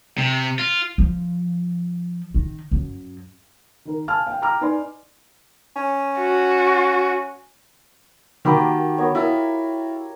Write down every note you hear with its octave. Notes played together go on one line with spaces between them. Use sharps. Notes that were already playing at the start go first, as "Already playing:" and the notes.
C3
F4
F3
D#3
F#2
D#3 A#4
F5 G#5 A5 F6
F5 G5
G5 A#5 D6 F6
D#4 B4 D5 G#5 C6
C#4
F#4
D#3 A#3 F#4 G4 B5 D6
A5
B3 A#4 C#5
E4 F4 A#4 F5